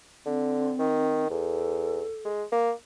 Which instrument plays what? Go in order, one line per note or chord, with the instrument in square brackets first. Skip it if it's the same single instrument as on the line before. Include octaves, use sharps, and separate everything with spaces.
[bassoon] D3 [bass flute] C4
[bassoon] D#3
[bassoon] E2 [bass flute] A4
[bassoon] G#3
A#3